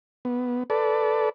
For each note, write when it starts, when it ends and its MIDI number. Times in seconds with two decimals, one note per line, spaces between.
0.25 0.63 59
0.70 1.29 69
0.70 1.29 71
0.70 1.29 74